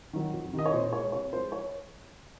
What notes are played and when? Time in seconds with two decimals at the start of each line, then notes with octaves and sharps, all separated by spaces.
0.13 D#3 F#3
0.33 F2
0.53 C3 D#3
0.59 D#5
0.66 C#5
0.73 A#2 C5
0.93 G#3 C#5
1.12 C3 C#5
1.33 F3 C5
1.36 G#3
1.52 C#5